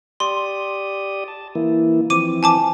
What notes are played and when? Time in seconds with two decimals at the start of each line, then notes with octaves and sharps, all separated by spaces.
0.20 G4 D5 C6 D#6
1.28 A5
1.55 E3 A#3 E4
2.10 E3 F3 C4 D6 D#7
2.43 G#5 A5 D6